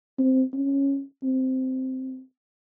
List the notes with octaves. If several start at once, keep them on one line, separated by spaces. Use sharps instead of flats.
C4
C#4
C4